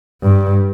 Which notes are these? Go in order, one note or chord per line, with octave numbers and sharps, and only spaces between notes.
G2